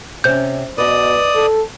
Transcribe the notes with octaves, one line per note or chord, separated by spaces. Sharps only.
C3 C#4 C5 G6
B2 B4 D5 D#5 D#6
A4